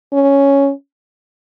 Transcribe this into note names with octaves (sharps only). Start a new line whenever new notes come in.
C#4